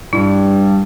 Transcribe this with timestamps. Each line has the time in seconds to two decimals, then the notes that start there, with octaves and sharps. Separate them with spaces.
0.13 G2 E4